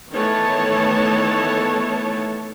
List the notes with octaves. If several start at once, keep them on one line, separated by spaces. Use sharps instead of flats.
D#3 E3 A3 B3 C#5 A5